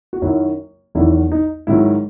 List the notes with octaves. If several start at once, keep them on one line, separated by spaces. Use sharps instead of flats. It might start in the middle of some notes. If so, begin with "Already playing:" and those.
F#4
F#2 D#3 F#3 E4
E2 D#3 F#3 E4
D#4
G#2 D#3 F#3 E4